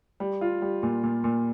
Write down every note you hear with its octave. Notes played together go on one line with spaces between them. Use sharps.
G3
F4
G3
A#2
A#2
A#2